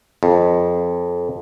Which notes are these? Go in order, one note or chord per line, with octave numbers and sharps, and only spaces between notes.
F2